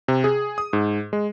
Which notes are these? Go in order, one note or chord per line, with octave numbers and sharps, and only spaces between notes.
C3
G#4
D#6
G#2
G#3